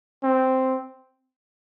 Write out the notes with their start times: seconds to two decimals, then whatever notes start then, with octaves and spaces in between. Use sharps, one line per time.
0.23 C4